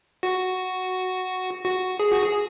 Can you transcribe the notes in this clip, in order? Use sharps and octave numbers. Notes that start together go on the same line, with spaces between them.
F#4
F#4
G#4
F#4
G#4